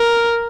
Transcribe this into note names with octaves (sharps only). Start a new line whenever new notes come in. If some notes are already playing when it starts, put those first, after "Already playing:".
Already playing: A#4